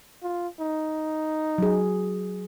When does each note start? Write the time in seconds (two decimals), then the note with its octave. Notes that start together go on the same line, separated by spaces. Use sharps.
0.23 F4
0.60 D#4
1.58 F#3 G#4